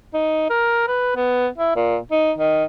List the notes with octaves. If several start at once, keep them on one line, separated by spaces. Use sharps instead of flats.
D#4
A#4
B4
B3
E4
A#2
D#4
D#3